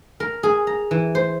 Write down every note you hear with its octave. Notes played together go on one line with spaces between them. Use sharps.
A#4
G#4
A#5
E3
C5